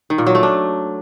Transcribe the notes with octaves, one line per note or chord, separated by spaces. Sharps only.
D#3
A#2
F#3
A3
D4